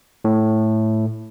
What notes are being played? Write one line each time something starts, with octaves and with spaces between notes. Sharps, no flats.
A2